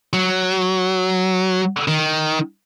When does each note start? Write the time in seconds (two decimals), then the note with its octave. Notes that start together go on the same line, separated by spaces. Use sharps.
0.13 F#3
1.88 D#3